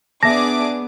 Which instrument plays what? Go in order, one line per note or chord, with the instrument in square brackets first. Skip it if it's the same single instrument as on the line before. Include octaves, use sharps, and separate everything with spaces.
[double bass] B3 [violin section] D4 G#4 D6 [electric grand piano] E5 A5 [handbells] A#6